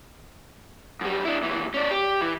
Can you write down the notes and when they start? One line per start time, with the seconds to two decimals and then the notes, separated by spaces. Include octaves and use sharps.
1.01 F#2 G3
1.25 D4 E4
1.43 D#2 E3
1.74 C#4 D5
1.91 G4
2.21 E3